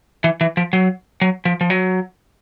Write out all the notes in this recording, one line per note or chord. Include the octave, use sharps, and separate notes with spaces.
E3
E3
F3
F#3
F#3
F3
F3
F#3